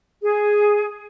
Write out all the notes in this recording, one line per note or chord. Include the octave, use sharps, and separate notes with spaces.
G#4